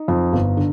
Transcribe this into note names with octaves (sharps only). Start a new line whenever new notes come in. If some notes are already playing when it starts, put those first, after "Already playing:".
Already playing: D#4
F2
G1
D3